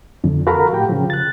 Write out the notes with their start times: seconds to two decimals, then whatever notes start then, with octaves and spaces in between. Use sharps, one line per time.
0.24 F2 D3
0.47 F#4 A4 A#4 F5 A#5 B5
0.73 A2 G4 G5
0.89 C#3 F3
1.10 F#6 A6